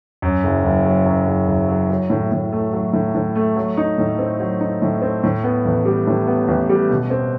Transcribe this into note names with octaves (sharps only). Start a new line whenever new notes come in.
F#2
F#1
F#1
F#3
F#2
F#1
F#1
F#3
F#3
A2
A2
A3
F#3
A2
A2
A3
F#3
D#4
A2
C4
F#3
D#4
A2
C4
A2
B3
A1
G3
A2
B3
A1
G3
B2
C4